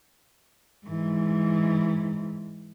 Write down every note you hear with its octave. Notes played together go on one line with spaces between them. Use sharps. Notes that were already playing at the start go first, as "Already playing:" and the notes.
G#2 E3